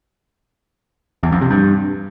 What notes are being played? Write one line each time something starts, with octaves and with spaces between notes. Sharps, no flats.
E2
F2
C3
G2